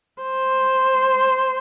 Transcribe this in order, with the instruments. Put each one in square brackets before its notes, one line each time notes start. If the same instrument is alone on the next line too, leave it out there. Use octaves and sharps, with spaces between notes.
[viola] C5